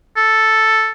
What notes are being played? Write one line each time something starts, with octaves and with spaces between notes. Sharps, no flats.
A4